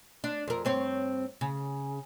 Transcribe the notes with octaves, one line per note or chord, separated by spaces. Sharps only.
D4
F2 A#4
G2 C4 C#5
C#3